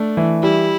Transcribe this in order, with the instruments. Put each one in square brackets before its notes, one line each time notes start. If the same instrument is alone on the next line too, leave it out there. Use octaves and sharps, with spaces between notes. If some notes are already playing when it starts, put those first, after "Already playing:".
Already playing: [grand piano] A3 [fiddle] D4
[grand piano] E3
[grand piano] G3 [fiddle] E4